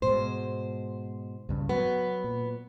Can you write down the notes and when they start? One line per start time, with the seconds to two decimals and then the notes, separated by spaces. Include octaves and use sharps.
0.02 G#2 B2 G#3 C5
1.49 C#2 G2 C#3
1.69 F#3 B3
2.24 A#2